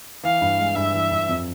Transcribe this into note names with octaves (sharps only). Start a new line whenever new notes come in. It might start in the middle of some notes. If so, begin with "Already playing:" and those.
E3 F5
G2
G#3
G2 E5
E3
G2
F2